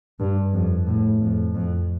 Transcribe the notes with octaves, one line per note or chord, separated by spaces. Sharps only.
G2
F2
A2
F2
F2